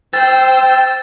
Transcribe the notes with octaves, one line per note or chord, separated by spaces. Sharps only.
C5 G5 E6 A6